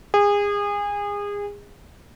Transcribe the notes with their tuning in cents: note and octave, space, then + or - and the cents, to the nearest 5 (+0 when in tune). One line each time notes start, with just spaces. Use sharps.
G#4 -30